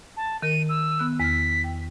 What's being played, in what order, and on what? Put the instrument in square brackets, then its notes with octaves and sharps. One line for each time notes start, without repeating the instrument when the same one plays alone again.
[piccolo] A5
[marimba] D#3 A#4 [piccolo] D#7
[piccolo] E6
[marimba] B3 F#6
[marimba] E2 F6 [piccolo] B6
[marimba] G5